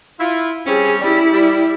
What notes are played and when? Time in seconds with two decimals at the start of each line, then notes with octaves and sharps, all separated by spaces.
0.20 E4 F4
0.67 G3 C4 C#4 G#4
1.01 G3 E4
1.32 G3